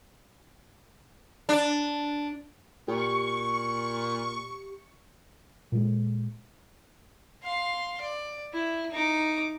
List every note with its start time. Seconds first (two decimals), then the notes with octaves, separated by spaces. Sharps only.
1.49 D4
2.88 A#2 G4 C#6
5.72 A#2 G#3
7.43 F5 C6
8.01 D5
8.53 E4
8.91 D#4 D6